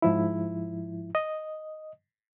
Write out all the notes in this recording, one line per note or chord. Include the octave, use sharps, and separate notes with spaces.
G#2 F3 E4
D#5